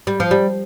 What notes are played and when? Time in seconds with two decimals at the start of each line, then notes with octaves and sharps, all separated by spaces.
0.07 G3
0.20 F3
0.31 G3